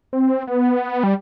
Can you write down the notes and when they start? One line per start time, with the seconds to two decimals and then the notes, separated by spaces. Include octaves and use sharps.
0.13 C4
0.47 B3
1.03 G3